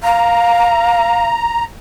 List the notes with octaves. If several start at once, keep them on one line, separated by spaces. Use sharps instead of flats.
F5 A#5